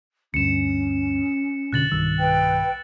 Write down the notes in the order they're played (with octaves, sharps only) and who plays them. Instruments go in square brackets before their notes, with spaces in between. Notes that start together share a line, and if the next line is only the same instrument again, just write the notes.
[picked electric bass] D2 G2 [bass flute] C#4 [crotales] C#7 E7
[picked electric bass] F1 B2 D3 [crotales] F#6 A6 F#7
[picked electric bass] B1 G2 D#3 [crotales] E6
[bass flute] B4 [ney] G5